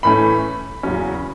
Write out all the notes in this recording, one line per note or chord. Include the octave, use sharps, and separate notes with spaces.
A2 E3 A3 C#4 B5
E2 C#3 F#3 C#4